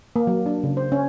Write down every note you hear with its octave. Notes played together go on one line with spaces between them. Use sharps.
A#3
F#3
D4
C#3
C5
C#4